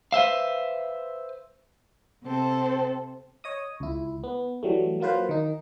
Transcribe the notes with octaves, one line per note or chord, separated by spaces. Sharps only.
B4 C5 E5 F5
C3 C4 A4
C#5 D#5 D#6
C#2 E4
B3
E3 F#3 G3 A3
F#3 A#3 F4 B4 C5
D#3 D#4